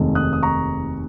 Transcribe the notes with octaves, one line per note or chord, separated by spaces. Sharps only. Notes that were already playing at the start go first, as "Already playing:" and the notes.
Already playing: F1 D#2 D#3 G#3
D#6 F#6
D#6
A#5 C#6